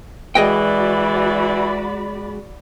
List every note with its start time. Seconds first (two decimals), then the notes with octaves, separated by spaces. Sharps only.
0.35 E3 G#3 F#4 G#4 D5 D#5 G5 B5